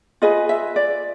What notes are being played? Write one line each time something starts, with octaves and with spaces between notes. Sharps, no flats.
F4 G#4 B4 D#5
E5
D5